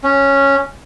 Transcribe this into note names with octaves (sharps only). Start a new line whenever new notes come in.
C#4